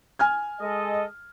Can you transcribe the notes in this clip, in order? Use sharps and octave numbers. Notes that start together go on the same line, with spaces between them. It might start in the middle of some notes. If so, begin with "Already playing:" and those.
G#5 F6 G#6
G#3 A4 D#5